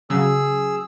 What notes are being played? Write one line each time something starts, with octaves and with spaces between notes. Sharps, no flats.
C#3 F#3 G#4 E6